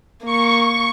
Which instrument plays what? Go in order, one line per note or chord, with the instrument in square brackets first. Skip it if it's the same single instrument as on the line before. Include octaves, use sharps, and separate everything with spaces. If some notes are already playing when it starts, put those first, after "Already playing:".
[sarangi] A#3 [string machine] C#6